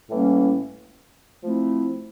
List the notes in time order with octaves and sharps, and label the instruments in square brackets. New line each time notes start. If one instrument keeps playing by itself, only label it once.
[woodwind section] A2 E3 G3 A#3 C#4
F3 A3 C4 E4